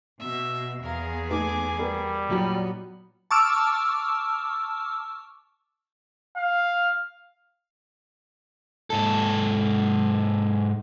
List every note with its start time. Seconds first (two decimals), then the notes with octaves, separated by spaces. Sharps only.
0.20 B2 E5
0.83 E2 B3 G#4 A#4 F5
1.30 A3 D#4 B4 G#5 D6
1.79 G3 A#4 B4
2.29 A#2 F#3 B3 D#4
3.31 A5 C#6 D6 E6 F6
6.37 F5
8.90 G#2 A4